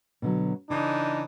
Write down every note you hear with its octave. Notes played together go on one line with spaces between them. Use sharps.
B2 D3 F#3
C#3 E3 D4 D#4